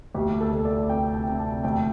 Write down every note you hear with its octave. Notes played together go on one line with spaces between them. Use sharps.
D2 G4
A4
D2
D5
C3 G5
G5
C3
A5
D2 G5